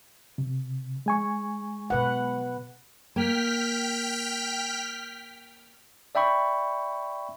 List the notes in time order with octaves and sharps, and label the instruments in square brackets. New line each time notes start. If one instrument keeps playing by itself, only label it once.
[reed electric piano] C3
G#3 G#5 C#6
[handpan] B2 B4 F#5
[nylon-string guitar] A#3 [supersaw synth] G5 F6 B6
[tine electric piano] D5 E5 G5 B5 C#6